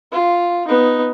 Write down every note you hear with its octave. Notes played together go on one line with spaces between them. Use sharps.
F4
B3 D#4